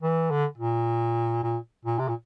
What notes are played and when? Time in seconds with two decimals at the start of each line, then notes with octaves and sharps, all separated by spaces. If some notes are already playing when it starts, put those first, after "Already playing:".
0.03 E3
0.30 D3
0.58 A#2
1.43 A#2
1.85 A#2
1.99 C3
2.08 A#2